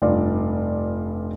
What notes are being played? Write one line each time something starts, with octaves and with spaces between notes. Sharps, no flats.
F1 G2 F4 D5